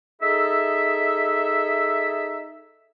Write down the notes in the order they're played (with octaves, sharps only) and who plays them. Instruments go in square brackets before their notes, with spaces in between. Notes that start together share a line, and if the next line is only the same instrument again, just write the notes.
[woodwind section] D#4 G#4 A4 E5